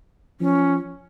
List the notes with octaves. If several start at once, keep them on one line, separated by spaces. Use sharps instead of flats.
F3 C#4